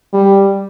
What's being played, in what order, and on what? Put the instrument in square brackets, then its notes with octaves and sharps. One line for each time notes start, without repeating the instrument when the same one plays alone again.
[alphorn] G3